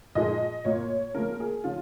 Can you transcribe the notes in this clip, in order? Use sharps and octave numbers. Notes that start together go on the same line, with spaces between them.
A#2 F3 G#3 D#5
A#2 A#3 C#5
C#3 F3 A#3 A#4
G#4
C#3 F3 F4